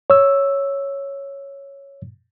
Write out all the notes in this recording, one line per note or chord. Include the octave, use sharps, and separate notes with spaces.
C#5 E6